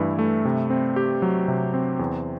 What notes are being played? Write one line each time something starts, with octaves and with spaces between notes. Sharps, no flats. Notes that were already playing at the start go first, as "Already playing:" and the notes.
Already playing: G2 E3 A3 E4
A3
C3
C4
G4
F#3
C3
C4
E2